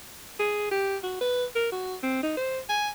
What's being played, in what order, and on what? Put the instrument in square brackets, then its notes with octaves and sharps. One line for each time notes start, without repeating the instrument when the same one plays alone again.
[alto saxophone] G#4
G4
F#4
B4
A#4
F#4
C4
D#4
C5
G#5